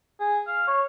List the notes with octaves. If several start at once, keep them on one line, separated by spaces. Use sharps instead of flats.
G#4
F5
C#5